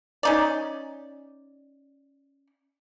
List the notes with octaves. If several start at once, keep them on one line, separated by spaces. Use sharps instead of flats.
C#4 D#4 D5